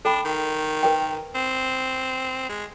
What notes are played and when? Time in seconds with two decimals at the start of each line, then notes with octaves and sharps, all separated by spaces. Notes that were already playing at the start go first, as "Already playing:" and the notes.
0.05 D4 A4 G5 B5
0.25 D#3
0.83 A#4 B4 G5
1.35 C4
2.49 G#3